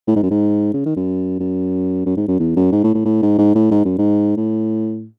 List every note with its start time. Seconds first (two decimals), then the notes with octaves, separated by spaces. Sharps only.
0.07 A2
0.16 G#2
0.23 F#2
0.30 G#2
0.74 C#3
0.86 D#3
0.96 F#2
1.40 F#2
2.06 F#2
2.17 G#2
2.28 F#2
2.40 E2
2.56 F#2
2.72 G#2
2.84 A2
2.94 A2
3.05 A2
3.22 G#2
3.38 G#2
3.55 A2
3.71 G#2
3.85 F#2
3.98 G#2
4.37 A2